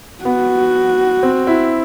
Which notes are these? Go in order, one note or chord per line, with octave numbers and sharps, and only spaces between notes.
B3 F#4
C4
E4